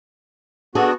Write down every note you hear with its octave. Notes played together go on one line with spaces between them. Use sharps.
B3 D4 F#4 G#4 A4